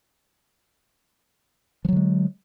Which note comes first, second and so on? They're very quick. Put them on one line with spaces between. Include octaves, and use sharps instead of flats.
F3 F#3 D3 G#3